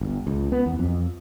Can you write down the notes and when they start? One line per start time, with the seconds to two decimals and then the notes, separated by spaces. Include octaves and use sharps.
0.01 G1
0.27 C#2
0.52 B3
0.66 E2
0.79 F2